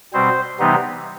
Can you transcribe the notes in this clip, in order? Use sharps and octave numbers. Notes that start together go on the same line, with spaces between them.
B2 G3 C4 C5
C3 E3 G3 B3 D#4